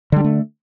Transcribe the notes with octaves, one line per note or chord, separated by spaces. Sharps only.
D3 G3 A3 D4